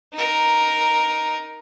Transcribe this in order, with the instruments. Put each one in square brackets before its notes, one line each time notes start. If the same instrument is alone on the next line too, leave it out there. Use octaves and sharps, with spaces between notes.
[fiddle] D#4 A#4